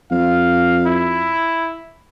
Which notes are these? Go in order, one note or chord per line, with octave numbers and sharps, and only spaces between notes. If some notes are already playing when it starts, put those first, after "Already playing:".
F2 F5
E4